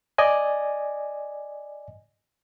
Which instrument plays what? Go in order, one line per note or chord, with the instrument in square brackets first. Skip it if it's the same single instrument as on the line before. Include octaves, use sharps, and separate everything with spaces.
[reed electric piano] D5 D#5 G#5